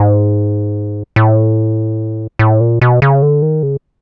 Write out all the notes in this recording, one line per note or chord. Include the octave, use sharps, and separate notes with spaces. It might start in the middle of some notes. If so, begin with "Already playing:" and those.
Already playing: G#2
A2
A2
A#2
B2
C#3
D3
D#3
C#3